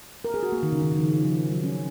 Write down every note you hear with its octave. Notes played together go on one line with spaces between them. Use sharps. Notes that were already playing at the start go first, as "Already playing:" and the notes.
A#4
G#4
F#4
A#3
D#3
C#3
D#3
C#3
F3
D#3
D#3
F3
F#3
C#4